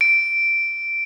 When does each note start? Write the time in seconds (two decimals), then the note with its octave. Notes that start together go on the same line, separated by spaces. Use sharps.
0.01 D7